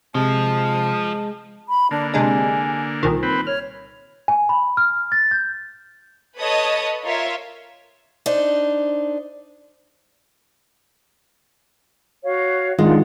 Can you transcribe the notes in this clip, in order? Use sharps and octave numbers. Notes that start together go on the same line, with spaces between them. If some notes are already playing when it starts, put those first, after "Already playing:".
C3 F3 G#3 A5
B5
D3 A#3 D4
C3 G#3 D4 G#5
C2 A#2 D#3
C4 B4 B5
C#5 F6
G#5
B5
F6
A6
G6
A4 B4 C#5 D#5 A5 D#6
F4 A#4 C#5 E5
D4 D#4 C5
F#4 C#5 F5
D#3 G#3 D4 F4 F#5